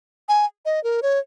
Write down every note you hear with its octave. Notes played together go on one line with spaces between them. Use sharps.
G#5
D#5
A#4
C#5